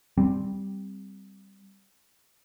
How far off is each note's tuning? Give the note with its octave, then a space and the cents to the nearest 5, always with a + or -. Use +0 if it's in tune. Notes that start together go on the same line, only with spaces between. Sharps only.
G3 +0 C4 +0